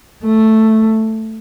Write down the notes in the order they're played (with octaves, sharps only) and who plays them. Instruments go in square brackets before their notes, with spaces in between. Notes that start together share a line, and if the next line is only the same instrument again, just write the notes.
[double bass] A3